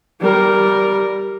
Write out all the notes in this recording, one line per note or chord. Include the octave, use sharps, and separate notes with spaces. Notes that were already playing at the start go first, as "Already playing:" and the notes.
G3 A#4